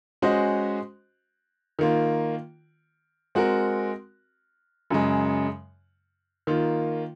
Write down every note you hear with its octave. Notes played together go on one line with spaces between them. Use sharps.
G#3 C#4 F#4 C5 D#5
D#3 A#3 F4
G#3 C4 F#4 A#4
F#2 C#3 G#3
D#3 A#3 F4